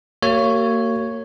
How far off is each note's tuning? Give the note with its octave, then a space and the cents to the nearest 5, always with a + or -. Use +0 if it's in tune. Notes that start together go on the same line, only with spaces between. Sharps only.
A#3 -30 F#4 +45 C#5 +0